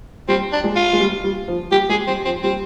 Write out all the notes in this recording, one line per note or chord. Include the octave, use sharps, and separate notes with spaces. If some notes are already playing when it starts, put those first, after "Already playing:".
G3 C4
D4
G#3
F4
G#3
G3
G3
F3
G3 G4
G#3 G#4
G3 C4
F3 C4
G3 C4